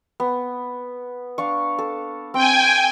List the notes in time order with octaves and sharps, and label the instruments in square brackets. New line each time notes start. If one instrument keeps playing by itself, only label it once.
[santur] B3
D4 F5 C#6
A4
[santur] C4 [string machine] G5 G#5